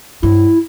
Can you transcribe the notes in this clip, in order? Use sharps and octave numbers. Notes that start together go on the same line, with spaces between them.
G2 E4